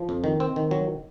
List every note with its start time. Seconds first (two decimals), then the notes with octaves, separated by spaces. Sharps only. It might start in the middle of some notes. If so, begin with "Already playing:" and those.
Already playing: F3
0.09 F2
0.24 D#3
0.40 C4
0.56 D#3
0.71 F#3